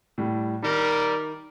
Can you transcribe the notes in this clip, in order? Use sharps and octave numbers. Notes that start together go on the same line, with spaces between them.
A2 G3
D#3 G3 A#4